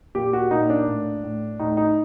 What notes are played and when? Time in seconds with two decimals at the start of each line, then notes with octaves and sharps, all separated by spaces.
0.15 A#2 G4
0.33 F#4
0.51 A#2 D#4
0.70 D4
0.87 A2
1.24 A2
1.60 A2 D#4
1.77 D#4